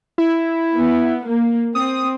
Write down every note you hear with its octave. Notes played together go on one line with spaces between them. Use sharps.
E4
B3
A#3
C4 D#6